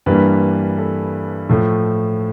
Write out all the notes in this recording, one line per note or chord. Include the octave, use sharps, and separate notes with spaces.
G2 E3 G3 A#3 B4
A4
A2 F3 A3